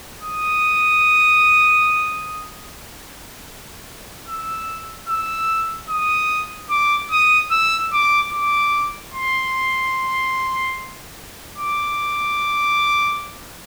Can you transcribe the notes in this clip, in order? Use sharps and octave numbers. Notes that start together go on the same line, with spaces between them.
D#6
E6
E6
D#6
D6
D#6
E6
D6
D6
C6
D6